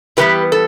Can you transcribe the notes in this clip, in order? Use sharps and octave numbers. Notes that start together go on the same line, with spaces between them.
A2 E3 G3 B3 G4 B4
A4